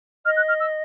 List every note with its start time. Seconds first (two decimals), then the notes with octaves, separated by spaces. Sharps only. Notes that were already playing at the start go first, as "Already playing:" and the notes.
0.25 D#5 F6
0.37 F#6
0.49 F6
0.60 E6